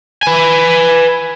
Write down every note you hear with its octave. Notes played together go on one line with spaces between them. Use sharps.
B4 G#5